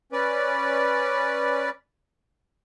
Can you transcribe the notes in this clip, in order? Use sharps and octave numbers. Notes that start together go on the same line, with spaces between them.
C#4 B4 D5